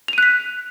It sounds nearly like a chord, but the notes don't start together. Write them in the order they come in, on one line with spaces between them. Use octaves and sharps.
F7 D#7 F#6 B6